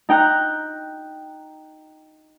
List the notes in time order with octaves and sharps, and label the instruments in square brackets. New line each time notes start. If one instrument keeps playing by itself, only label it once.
[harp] D#4 G5 A#5 F#6